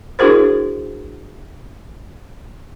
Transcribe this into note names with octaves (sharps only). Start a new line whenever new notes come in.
D4 E4 F#4 G#4 A#4 C5